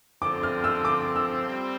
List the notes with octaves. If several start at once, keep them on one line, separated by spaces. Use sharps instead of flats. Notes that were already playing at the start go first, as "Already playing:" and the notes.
D3 F3 C4 D6
F6
E6
D6
E6
G3 C4